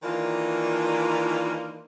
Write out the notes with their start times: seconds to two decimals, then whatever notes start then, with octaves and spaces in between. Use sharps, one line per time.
0.03 D#3 E3 A#3 D4 D#4 F4